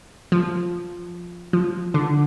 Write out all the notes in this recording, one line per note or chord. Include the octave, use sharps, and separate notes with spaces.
F3
F3
D3